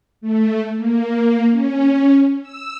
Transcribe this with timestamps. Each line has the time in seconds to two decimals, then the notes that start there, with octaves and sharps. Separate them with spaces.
0.21 A3
0.76 A#3
1.51 C#4
2.42 E6